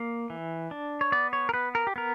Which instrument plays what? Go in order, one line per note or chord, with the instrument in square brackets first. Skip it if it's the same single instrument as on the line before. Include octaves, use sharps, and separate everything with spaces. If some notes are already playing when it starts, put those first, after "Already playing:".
Already playing: [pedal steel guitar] A#3
E3
D4
C#5
B3 D5
C#5
A#4
B3 B4
A#4
G4
B3 A#4